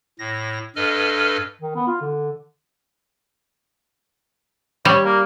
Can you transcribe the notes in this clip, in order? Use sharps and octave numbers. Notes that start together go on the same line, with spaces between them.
A2 A#6
G2 A4 B4 D#5 F6
D#3
B3
F4
D3
G3 C#5
A#3